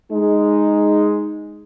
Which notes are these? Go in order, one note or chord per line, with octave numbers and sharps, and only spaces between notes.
G#3 D#4